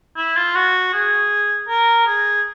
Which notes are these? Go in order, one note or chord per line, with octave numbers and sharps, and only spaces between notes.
E4
F4
F#4
G#4
A#4
G#4